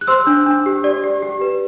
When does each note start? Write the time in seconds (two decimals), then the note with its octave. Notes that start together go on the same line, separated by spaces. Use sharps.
0.01 F#6
0.07 C5 C6 E6
0.27 D4
0.46 D4
0.66 G4
0.84 D5
1.04 G4
1.22 G4
1.41 B4